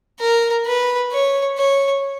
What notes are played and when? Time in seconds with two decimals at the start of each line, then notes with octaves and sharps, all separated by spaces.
0.20 A#4
0.66 B4
1.12 C#5
1.58 C#5